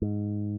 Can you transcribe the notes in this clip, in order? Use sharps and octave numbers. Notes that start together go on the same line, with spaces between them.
G#2